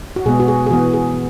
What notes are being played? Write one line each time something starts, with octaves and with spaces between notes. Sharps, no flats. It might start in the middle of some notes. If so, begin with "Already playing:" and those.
F#4
B2 G#3 B3 G#4
F#4
G#4
G#4
E3 B3 F#4
G#4